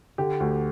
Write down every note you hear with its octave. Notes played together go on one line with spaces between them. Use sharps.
D3 G4
D2